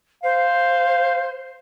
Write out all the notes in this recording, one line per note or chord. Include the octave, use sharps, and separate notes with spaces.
C5 F5